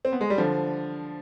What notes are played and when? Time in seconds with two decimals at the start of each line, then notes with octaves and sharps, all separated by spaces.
0.05 C4
0.12 B3
0.21 G#3
0.30 G3
0.38 D3 F3